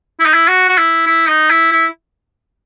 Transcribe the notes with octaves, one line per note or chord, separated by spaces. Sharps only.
E4
D#4
E4
F#4
F#4
E4
E4
D#4
E4
E4